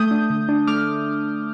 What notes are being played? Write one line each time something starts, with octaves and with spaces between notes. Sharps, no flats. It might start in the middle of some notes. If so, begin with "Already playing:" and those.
Already playing: A3 D#6 G6
D4
D3
D4
A3 D6 F6